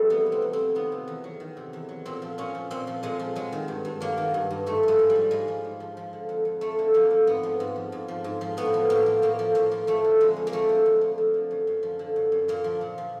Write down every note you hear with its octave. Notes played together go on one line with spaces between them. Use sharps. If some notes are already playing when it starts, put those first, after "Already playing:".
Already playing: F2 G3 A3
E3 B3
C3
C4
F2
C4
F2
D#3 B3
C3
E2
F#3
D#3
C3
E2
F#3
A#2 C4
F3
A#2 C#4
F3
A#2 C4
F3
A#2 G#3
F3
F#3 G#3
D#3
G2
G2
F#3 A#3
D#3
G2
G2
G#2 A3
F3 G#3
G#2
G3
F3
G#2 G#3
F3
G#2
F3
F3
D3
F2
F2
F3 A3
D3
F2 A#3
F2
G#2 B3
F3
G#2
F3
G#2
F3
G#2
F3
A2 B3
F3
A2 A#3
F3
A2 A#3
F3
A2 A#3
F3
F3 A3
D3
F2 G#3
F2
A#3
F3 A3
D3
F2
F2
F3
D3
F#2
F#2
F3
D3
F#2
F#2
A#2 A#3
F3
A#2
F3